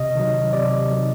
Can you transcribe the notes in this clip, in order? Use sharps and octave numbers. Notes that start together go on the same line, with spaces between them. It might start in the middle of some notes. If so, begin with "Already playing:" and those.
Already playing: C3 D#5
D#3 F#3
C3 D5
D#3 F#3